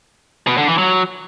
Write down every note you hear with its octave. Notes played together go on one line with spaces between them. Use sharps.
B2
D3
E3
F#3